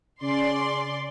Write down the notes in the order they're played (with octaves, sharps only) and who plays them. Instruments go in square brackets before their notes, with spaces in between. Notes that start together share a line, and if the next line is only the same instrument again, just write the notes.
[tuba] C#3 [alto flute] C#4 [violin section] D5 C6